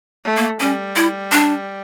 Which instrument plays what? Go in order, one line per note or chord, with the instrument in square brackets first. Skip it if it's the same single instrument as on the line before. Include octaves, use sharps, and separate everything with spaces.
[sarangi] A3
[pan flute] A#3
[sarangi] G3 [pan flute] C#4
[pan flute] E4
D4